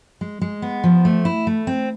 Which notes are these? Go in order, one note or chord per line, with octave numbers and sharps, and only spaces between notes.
G#3
G#3
B3
F3
A3
E4
A3
C4